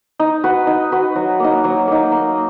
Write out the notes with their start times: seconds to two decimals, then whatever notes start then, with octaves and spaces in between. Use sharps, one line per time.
0.19 D#4
0.44 F#4 B4
0.67 D#4
0.92 F#4 B4
1.15 F#3
1.40 A#3 D#4
1.64 F#3
1.87 A#3 D#4
2.12 A#3